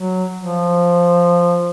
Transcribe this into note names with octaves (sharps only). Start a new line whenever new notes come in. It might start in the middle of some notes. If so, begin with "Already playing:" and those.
Already playing: F#3
F3